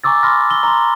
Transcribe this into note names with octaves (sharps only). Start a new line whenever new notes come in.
G#5 A#5 C#6 D6 E6 A6
B5 C6 F6 A#6
E6 G7
A#5 C6